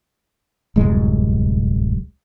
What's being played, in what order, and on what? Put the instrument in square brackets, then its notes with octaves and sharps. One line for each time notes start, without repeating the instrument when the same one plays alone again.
[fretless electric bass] D1 C2 F#2 G#3